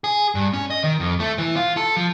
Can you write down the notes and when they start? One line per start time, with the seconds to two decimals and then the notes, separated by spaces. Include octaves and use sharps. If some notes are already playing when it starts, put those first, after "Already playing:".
0.04 G#4
0.35 G2
0.53 C#4
0.70 D#5
0.84 D#3
1.00 F2
1.20 A3
1.38 E3
1.56 F4
1.77 A4
1.97 F3